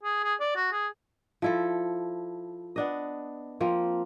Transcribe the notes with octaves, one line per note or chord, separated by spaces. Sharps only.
G#4
G#4
D5
F#4
G#4
F3 E4 A4
B3 D4 D#5
F3 A#3 C4